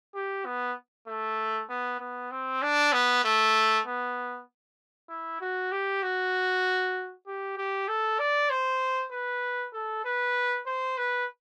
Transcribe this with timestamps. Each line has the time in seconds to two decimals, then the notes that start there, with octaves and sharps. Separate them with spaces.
0.15 G4
0.46 B3
1.07 A3
1.70 B3
2.00 B3
2.31 C4
2.62 D4
2.93 B3
3.24 A3
3.86 B3
5.09 E4
5.41 F#4
5.72 G4
6.03 F#4
7.27 G4
7.57 G4
7.88 A4
8.19 D5
8.50 C5
9.12 B4
9.73 A4
10.05 B4
10.66 C5
10.98 B4